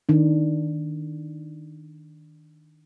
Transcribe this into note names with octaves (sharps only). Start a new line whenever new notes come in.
D#3 D4